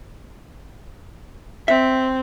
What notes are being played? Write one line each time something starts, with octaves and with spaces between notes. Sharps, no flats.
C4 E5